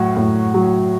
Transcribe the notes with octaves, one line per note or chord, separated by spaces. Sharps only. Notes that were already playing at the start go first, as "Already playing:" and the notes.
Already playing: A2 F#3 F#4 F#5
A2
F#3